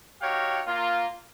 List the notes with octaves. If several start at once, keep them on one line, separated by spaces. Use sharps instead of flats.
D#4 F#4 G4 C#5 F5 G5
A#3 F4